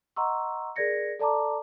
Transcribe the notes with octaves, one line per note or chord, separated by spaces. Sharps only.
D#5 F#5 A#5 C6 C#6 E6
G#4 A#4 D5 G#6 A#6 C#7
A4 D5 A5 A#5 D6